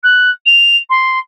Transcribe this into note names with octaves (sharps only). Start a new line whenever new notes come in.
F#6
F7
C6